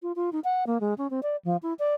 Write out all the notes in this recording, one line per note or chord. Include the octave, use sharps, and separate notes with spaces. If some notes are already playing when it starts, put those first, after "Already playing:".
F4
F4
D#4
F#5
A#3
G#3
C#4
C4
D5
F3
E4
D5